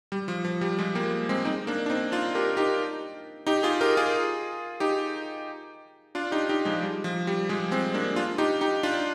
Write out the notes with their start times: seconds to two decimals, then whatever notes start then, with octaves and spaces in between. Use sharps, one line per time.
0.12 G3
0.28 F3
0.45 F3
0.61 G3
0.78 F3 G#3
0.95 G3 A#3
1.29 G#3 C4
1.45 C4 D#4
1.67 A#3 D4
1.86 D4
1.90 C4 D#4
2.12 D4 F4
2.35 G4 A#4
2.57 D#4 G4
3.47 D#4 G4
3.63 F4 G#4
3.81 G4 A#4
3.97 F4 G#4
4.80 D#4 G4
6.15 D4 F4
6.31 D#4 G4
6.49 D#4 G4
6.65 F3 G#3
6.82 G3
7.04 F3
7.27 G3
7.49 F3 G#3
7.71 G#3 C4
7.94 A#3 D4
8.16 D4 F4
8.38 D#4 G4
8.61 D#4 G4
8.83 D4 F4